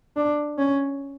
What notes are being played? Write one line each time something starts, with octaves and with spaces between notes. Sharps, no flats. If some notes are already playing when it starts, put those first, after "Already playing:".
D4
C#4